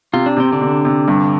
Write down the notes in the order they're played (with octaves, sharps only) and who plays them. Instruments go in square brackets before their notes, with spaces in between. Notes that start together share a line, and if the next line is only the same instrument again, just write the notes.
[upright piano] C3 [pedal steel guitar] F4
[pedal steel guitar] D4
[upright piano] C3 [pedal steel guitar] C4
[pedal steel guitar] D3 D4
[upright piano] C3
C3
G2